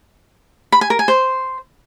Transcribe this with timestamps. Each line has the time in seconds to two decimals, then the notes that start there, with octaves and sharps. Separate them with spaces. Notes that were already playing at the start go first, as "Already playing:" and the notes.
0.72 B5
0.81 G#5
0.90 A#4
0.99 G#5
1.08 C5